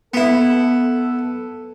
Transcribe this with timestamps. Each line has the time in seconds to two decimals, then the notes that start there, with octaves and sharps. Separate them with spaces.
0.14 B3 E4 A4